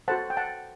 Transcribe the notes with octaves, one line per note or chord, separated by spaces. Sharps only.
F#4 A4 C5 F#5 A5
G5
F#5 A5